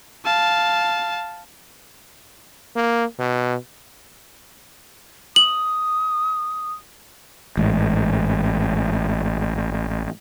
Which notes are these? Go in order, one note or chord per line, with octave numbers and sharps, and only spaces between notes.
F5 A5
A#3
B2
D#6 F#7
A1 G#2